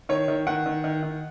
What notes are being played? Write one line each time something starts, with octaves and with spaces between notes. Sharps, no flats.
D#3 C#5
D#3
D#3 F#5
D#3
D#3
D#3